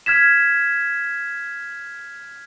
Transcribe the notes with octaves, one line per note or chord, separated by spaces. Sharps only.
F6 G#6 B6 E7